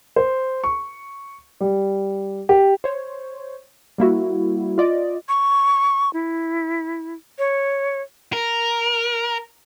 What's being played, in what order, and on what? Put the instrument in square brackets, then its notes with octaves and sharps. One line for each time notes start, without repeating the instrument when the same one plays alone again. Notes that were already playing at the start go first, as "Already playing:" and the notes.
[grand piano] C5
C#6
G3
G4
[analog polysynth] C5 C#5
G3 A#3 E4 F#4
F4 D5 D#5
[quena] C#6
E4
C#5
[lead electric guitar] A#4